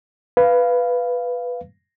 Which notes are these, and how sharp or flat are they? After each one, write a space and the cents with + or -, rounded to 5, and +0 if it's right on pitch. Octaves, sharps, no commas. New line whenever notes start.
B4 +0 F5 -10